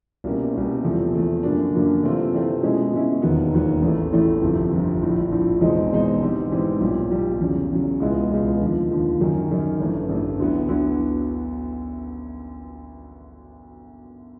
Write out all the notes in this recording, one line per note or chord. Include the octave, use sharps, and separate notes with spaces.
C2 B2 G3 A#3 C#4
C2 B2 G3 A#3 C#4
E2 C3 F3 A3
E2 C3 F3 A3
F#2 D3 F#3 A#3 D4
F#2 D3 F#3 A#3 D4
C3 E3 A3 C4 F4
C3 E3 A3 C4 F4
B2 G#3 C#4 E4
B2 G#3 C#4 E4
E1 D#2 D#3 F#3 B3
E1 D#2 D#3 F#3 B3
A1 A2 E3 A3
A1 A2 E3 A3
G1 F2 C3
G1 F2 C3
A#1 A2 F3
A#1 A2 F3
E2 B2 G#3 C4 D#4
E2 B2 G#3 C4 D#4
G#2 E3 G3 C4
G#2 E3 G3 C4
B1 A#2 G3
B1 A#2 G3
E2 C#3 F#3
E2 C#3 F#3
C#2 B2 G#3 B3 E4
C#2 B2 G#3 B3 E4
D#2 D3 F3
D#2 D3 F3
F#2 D#3 F#3
F#2 D#3 F#3
A1 G2 E3 A3
A1 G2 E3 A3
D2 D3 F#3 B3 E4
D2 D3 F#3 B3 E4